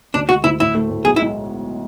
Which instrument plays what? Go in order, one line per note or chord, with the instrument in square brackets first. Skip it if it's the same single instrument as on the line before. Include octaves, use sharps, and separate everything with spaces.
[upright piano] D2 [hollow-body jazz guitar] D4
[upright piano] G#3 [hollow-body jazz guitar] F#4
[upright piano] D2 [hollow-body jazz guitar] E4
[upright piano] A2 [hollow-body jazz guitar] E4
[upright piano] A3
A2
[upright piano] B1 [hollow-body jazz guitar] G#4
[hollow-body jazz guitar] E4
[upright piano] G#3